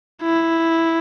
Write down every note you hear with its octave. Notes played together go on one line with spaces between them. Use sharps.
E4